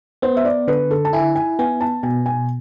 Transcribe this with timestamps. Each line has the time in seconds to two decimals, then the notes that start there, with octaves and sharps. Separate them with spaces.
0.22 B3 C5
0.37 E5
0.45 D5
0.68 D3 B4
0.91 A4
1.05 A5
1.13 E4 G#5
1.36 G#5
1.59 B3 G#5
1.81 A5
2.03 B2 G#5
2.26 G#5